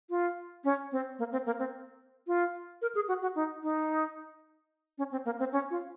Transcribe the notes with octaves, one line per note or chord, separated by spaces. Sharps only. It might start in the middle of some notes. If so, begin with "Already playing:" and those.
F4
C#4
C4
A#3
C4
A#3
C4
F4
A#4
G#4
F#4
F#4
D#4
D#4
C#4
C4
A#3
C4
C#4
F4